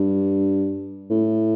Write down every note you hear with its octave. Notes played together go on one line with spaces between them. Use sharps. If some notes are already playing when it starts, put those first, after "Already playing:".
Already playing: G2
A2